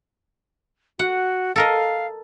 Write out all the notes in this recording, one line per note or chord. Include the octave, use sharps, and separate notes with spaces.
F#4 F#5
A4 A#4 D#5 F5